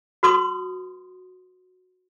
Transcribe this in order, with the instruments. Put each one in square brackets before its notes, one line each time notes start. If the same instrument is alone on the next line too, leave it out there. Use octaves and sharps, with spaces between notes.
[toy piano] F#4 B4 C6 D#6